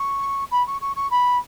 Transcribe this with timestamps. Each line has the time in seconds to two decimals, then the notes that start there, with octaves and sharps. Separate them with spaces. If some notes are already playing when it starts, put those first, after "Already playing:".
Already playing: C#6
0.51 B5
0.66 C#6
0.81 C#6
0.96 C#6
1.11 B5